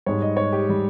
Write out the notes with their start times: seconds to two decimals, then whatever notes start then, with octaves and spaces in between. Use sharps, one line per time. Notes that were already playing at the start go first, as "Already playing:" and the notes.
0.06 G#2 G3 C#5
0.22 D#5
0.37 C#5
0.53 G4
0.69 G3